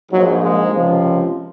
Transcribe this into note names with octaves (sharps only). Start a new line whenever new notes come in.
A#1 G#2 F3 F#3
G#3
C#2 C3 F3